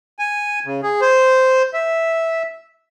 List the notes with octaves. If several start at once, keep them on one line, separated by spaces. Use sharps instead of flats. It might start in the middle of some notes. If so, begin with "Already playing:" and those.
G#5
C#3
G#4
C5
E5